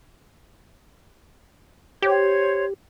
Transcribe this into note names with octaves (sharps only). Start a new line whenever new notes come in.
G4 C5 C#5 G#6